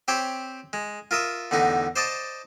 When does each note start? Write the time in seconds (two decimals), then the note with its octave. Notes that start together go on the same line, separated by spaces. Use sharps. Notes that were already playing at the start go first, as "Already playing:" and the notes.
0.08 C4 G4 C5 C#5 B5
0.73 G#3
1.11 F4 A#4 E5 D#6
1.51 E2 A2 D3 D#4
1.96 C5 D5 D#5 A5